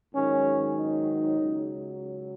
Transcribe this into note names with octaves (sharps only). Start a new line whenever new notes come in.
G#2 D#3 F#3 C#4
D#4
C#2 C#3 F#3